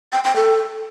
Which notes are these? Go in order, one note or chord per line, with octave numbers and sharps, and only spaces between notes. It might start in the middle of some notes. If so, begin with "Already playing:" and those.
G5
G5
A4